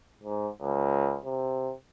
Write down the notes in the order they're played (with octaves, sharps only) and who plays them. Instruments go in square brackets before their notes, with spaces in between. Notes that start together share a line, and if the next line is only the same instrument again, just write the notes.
[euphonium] G#2
C#2
C3